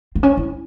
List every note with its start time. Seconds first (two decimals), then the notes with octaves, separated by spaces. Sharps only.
0.15 C4
0.23 C#4
0.37 E4